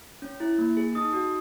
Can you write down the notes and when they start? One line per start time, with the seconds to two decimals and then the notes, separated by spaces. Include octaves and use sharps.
0.22 C#4
0.40 E4
0.58 A#3
0.77 G#4
0.95 D#4 D#6
1.13 F#4